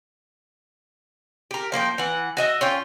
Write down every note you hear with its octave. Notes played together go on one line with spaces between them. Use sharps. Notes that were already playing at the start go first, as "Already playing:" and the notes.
G4 A#4
F3 A#3 D5 G5
E3 F#5
F#4 D#5 E5
C#4 F4 G5